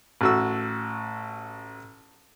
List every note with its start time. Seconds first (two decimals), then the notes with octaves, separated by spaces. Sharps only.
0.21 A1 F#4 E6